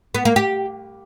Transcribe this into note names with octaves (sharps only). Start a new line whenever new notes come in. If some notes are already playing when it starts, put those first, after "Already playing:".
B3
A#3
G4